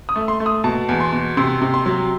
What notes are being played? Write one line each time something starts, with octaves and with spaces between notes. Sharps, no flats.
D#6
A3
C6
A3
D#6
B2 A5
E2
C6
B2
C3 C6
C3
C6
F#3